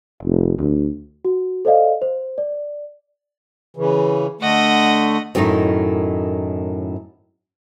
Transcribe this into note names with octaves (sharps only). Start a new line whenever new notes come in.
F1
D2
F#4
A4 C5 D5 D#5 F5
C5
D5
C#3 E3
D3 A3 D#5 F#5
F#2 A2 D#3 A3 D#4